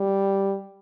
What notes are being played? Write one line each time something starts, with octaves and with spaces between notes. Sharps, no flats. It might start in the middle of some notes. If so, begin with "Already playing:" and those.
Already playing: G3